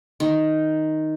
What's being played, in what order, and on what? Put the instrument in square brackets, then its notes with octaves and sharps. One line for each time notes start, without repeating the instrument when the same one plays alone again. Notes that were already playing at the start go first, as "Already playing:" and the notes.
[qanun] D#3